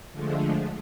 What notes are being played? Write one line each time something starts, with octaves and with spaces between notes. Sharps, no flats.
D3 F3 G#3 A3